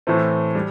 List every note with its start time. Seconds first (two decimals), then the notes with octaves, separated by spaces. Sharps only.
0.07 A2 E3 A3 C4
0.55 G3